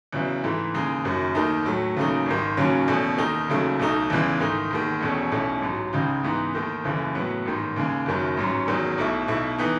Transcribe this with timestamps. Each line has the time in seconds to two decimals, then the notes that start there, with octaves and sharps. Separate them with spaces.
0.12 E2 C#3 F#3 B3 E4
0.43 G#2 E3 A3 E4
0.74 D#2 C#3 G#3 D#4
1.04 F#1 F#2 D#3 F#3
1.35 D#2 D#3 A3 D#4
1.65 A2 F#3 A3
1.96 D#2 C#3 F#3 A3 D#4
2.26 G#1 G#2 D#3
2.57 D#2 C#3 F#3 C#4
2.88 E2 B2 A3 C#4
3.18 D#2 D#3 A3 D#4
3.48 E1 D#2 C#3 F#3 A3
3.79 B1 B2 A3 D#4
4.10 E2 C#3 E3 G#3
4.40 G#2 D#3 A3 D#4
4.71 E1 D#2 D#3
5.01 E1 E2 B2 A3 C#4
5.31 B1 B2 A3 C#4 E4
5.62 A1 G#2 F#3
5.93 C#2 C#3 G#3 D#4
6.23 G#2 E3 B3 D#4
6.53 D#2 D#3 A3 D#4
6.84 F#1 F#2 C#3 E3 A3
7.15 A2 F#3 B3
7.46 A1 G#2 D#3
7.76 D#2 C#3 G#3
8.06 F#1 F#2 D#3 F#3
8.37 A1 G#2 F#3 C#4
8.67 E1 E2 D#3 F#3
8.98 B1 B2 A3 E4
9.28 B1 B2 A3 E4
9.59 E3 B3 D#4